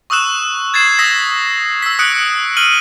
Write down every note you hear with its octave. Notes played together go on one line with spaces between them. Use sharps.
C#6 D#6 E6 F#6 E7
G#6 A6 C7 E7
D#6 E6 A#6 B6
E6 B6
D#6 F#6 C#7 D7
F6 D#7 F#7